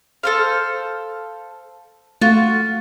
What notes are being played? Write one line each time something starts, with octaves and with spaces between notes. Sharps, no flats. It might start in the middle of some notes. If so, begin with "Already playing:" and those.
A4 C5 F5
A3 F4 F#4